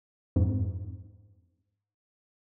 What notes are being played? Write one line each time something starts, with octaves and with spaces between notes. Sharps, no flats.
F2 G#2